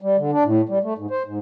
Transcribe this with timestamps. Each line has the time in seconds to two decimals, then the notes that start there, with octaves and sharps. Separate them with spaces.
0.02 G3
0.19 D3
0.32 D4
0.44 A2
0.69 G3
0.83 A3
0.98 G#2
1.10 C5
1.26 G#2